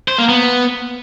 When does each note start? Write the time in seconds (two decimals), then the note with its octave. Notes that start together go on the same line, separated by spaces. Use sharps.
0.08 C5
0.18 A#3
0.29 B3